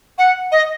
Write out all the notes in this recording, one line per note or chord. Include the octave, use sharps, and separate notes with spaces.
F#5
D#5